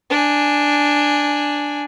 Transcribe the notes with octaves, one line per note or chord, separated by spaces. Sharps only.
D4 G#5